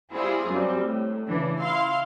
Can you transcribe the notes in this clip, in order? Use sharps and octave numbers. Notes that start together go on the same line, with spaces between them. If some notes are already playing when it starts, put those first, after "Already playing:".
G3 C4 E4 F4 G#4
F#2 G3 C4
A2
C#3 E3 D4
E4 F5 C6